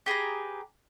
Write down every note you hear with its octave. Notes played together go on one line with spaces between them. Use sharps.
G4 G#4 B4 A#5